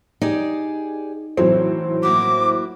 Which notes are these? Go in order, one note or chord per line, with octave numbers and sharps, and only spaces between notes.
D#4 G4 G#4 D5
A2 E3 F#3 C4
A#3 E4 F#4 D6